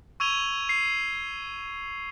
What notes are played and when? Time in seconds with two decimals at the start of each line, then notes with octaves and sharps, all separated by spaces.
0.20 C#6 E6 G#6 D#7 F7 G7
0.69 C7